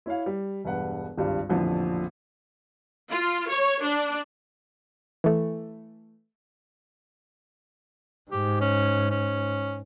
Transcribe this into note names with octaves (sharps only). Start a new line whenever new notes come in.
E4 C#5 F5
G3
E1 G2 B4 F#5
G#1 C#2 G2 G3
A1 F2 A#2 D3
F4
C#5
D4
E3 A3
G#2 G4
C#4
C#4